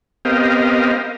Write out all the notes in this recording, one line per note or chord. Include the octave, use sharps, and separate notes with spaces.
B3 C4 G4 A#4 D#5 F5